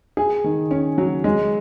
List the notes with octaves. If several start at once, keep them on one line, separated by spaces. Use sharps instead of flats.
G#4
D#3
C#4
F#3
G#3